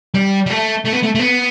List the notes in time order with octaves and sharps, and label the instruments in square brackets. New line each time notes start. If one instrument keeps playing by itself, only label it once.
[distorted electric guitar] G3
G3
A3
A3
B3
A3
A3
B3